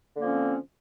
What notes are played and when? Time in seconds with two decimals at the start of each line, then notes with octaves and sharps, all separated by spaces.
0.15 D3
0.18 A#3
0.22 F3
0.25 C#4
0.28 C4